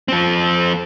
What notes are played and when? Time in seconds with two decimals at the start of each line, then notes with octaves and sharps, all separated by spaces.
0.08 F3 C4